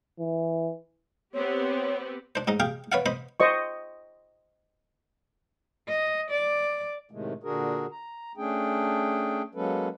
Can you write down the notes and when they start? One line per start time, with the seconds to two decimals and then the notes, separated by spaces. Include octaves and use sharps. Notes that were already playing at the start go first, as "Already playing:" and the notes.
0.20 E3
1.34 B3 C4 G4 C#5
2.35 D4 C5
2.47 G#2 D#4 D#5
2.60 G4 G#4 F5 G5
2.92 B4 C#5 D5 F5 F#5
3.06 C5 D#5 B5
3.40 C5 D#5 C#6
5.88 D#5
6.31 D5
7.11 A2 C3 D#3 G#3 A3
7.43 A#2 D3 D4 F#4 G#4 A#4
7.91 A#5
8.37 A3 C#4 D4 G#4 G5
9.55 F#3 G#3 A#3 C#4 A4 B4